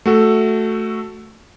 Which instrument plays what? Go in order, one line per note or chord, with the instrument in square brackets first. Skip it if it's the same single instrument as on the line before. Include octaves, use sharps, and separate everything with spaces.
[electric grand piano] A3 F#4 A4